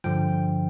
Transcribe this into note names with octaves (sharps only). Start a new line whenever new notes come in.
G2 D3 F3 G5